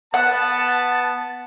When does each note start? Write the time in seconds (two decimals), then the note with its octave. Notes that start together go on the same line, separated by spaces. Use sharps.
0.14 B3 F#5 A5